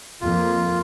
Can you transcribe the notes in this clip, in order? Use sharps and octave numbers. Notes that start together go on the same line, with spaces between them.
F2 A#3 F4